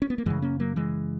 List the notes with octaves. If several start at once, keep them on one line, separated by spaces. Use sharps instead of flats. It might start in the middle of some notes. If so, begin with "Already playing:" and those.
C#4
B3
A#3
F#2 C#3 E3 G#3
A#3 C#4
F#3 A#3
E3 G#3